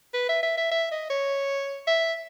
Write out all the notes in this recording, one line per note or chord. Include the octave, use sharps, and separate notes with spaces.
B4
E5
E5
E5
E5
D#5
C#5
E5